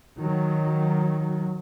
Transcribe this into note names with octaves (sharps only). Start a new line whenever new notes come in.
D#3 F#3